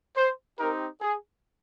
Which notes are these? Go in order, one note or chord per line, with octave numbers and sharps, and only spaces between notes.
C5
C4 D#4 G4 A#4
G#4